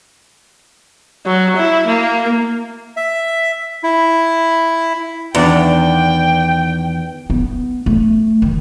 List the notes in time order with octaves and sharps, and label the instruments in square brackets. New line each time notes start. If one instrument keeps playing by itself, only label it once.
[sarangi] F#3
E4
A#3
[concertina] E5
E4
[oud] E2 [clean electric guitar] D#3 D4 D5 [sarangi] G5
[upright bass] B3
A3
D#3